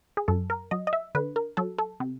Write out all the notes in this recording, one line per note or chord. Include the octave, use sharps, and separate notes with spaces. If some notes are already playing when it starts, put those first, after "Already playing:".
G#4
F#2 A4
A#4
F#3 D#5
D#5
E5
D3 B4
A#4
F#3 A4
A4
C3